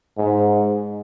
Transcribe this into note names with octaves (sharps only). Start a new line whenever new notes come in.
G#2